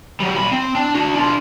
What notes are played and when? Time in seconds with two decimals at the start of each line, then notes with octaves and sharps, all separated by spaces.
0.20 F#3 G3
0.37 A#2 B5
0.52 C4
0.75 D4
0.95 D4 F#4
1.15 D4 F4